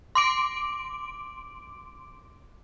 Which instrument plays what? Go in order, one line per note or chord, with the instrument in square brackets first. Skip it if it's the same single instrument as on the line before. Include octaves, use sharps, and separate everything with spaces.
[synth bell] C6 D6 D7